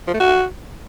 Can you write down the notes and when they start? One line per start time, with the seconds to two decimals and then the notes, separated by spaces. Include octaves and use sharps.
0.08 F3
0.14 A3
0.20 F#4